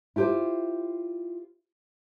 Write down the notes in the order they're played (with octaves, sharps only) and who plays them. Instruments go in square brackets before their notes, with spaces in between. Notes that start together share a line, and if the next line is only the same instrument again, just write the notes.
[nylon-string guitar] E4 F4 G4 A#4 C5